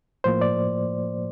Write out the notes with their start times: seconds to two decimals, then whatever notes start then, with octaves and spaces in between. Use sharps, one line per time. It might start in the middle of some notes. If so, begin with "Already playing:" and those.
0.24 A2 F3 A#3 C5
0.41 D5